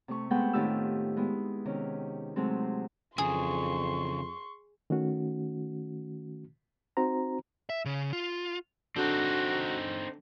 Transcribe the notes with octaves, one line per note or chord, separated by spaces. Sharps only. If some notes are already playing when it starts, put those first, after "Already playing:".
C3 A3 C#6
G#3 A3 B3 C4 F#5 G5
A2 D#3 C4 F4 G4 E6
G#3 B3 E4
C3 D#3 C#4
C3 F#3 G#3 A3 C4
F2 C#3 E3 G#4 C6 C#6
D#3 A3 C#4 F#4
C4 D#4 F#4 C5 A#5
E5
C#3
F4
D3 C4 D#4 F#4